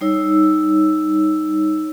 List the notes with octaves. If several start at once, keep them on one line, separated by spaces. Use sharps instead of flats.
G3 D#4 C#5 E6